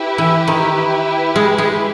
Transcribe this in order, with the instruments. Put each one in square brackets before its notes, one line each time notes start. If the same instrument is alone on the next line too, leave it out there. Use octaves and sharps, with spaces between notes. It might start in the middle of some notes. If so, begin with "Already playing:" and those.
Already playing: [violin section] E4 G4 B4
[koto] E3
D#3
G#3
G#3